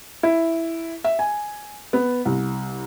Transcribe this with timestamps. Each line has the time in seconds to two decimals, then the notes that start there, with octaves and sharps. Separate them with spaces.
0.23 E4
1.04 E5
1.19 G#5
1.93 B3
2.25 C2